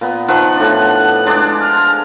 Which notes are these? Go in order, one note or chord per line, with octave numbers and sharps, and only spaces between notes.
A#2 B3
D#3 F3 B3 F#6
A2 D4
G#3 D4 D5
F6